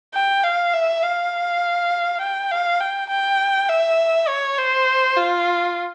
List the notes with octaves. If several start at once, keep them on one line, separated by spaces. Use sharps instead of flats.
G5
F5
E5
F5
G5
F5
G5
G5
E5
C#5
C5
F4